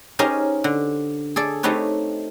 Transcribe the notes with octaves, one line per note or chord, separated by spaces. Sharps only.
C#4 D#4 G4 G#4 A#4 C5
D3
G#4 A4 D5
A3 C4 D#4 G4 B4 C#5